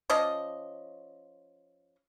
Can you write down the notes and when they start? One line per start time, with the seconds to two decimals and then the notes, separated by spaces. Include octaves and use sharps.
0.10 F3 C#4 D5 D#5